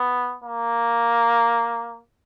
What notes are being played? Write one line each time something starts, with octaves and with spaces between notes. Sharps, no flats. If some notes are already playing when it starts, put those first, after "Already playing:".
Already playing: B3
A#3